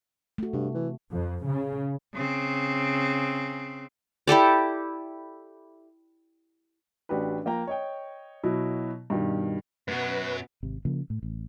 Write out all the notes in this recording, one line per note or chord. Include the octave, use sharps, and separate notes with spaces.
A3 F#4
G2 C3
E3
F2
C#3
C#3 C4
E4 G4 A4 D5
A1 D4 F#4 G4 B4
F3 A#3 G5 A#5
C#5 D#5 G5
B2 F#3 E4
G2 B2 D#3
F#2 B2 F#3 B3 B4
G#1 C3
C#3 F3 A#3
A2
A1